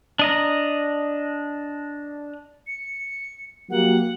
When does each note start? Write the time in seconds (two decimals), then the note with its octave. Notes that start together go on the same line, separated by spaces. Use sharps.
0.19 D4 D#5 A#5
2.67 C#7
3.70 F#3 A#3 G4 F#5